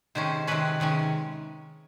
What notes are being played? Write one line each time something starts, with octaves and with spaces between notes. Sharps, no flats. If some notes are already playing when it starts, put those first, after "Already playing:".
C3 D#3 G#3 C#4 C5
C3 D#3 G#3 C#4 B4
C3 D#3 G#3 C#4